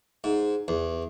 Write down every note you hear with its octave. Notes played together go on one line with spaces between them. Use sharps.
G#2
E2